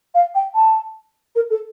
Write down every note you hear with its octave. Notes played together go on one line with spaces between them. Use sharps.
F5
G5
A5
A#4
A4